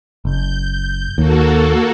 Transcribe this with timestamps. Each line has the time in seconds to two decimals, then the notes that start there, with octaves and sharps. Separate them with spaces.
0.25 F#1 G6
1.18 D#2 A#3 F#4 A4